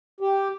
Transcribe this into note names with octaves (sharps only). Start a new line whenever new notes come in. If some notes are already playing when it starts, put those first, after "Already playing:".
G4